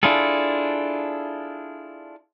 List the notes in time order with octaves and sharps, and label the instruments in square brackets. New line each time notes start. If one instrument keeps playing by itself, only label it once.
[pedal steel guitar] D4 E4 F4 G#4 A4